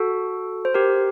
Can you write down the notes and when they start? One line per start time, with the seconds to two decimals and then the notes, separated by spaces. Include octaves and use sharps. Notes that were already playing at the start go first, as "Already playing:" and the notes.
Already playing: F#4 A4
0.65 C5
0.74 G4 A#4